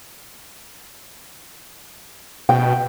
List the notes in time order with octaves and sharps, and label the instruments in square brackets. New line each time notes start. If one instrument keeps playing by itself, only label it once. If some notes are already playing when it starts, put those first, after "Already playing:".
[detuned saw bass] B2 [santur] G5